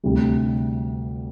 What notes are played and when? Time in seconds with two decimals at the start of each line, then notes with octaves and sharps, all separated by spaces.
0.04 D2 C3 G3